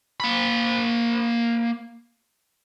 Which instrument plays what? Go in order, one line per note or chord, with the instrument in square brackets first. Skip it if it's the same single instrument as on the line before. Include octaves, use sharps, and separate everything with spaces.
[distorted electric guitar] A#3 B5